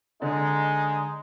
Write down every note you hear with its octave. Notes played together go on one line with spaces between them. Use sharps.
D3 G#3 D#4